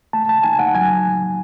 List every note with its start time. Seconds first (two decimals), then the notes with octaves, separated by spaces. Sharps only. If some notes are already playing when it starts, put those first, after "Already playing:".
0.13 A3 A5
0.29 A5
0.43 D#4 G#5
0.59 F#5
0.75 F#3 G#5